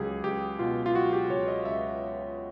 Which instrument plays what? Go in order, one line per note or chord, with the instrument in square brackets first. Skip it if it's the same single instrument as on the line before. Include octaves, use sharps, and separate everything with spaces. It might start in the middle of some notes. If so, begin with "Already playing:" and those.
Already playing: [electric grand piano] C#2 F#3 G4 G#4
C#2 G4
B2 F4
F4
F#3 F#4
G4
C#2 C#5
D#5
C#2 E5